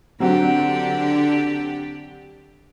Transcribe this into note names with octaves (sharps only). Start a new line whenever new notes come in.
D3 F#3 C4 D4 F#4 G4